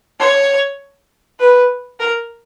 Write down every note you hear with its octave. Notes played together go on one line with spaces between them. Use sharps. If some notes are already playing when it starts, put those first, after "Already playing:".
C#5
B4
A#4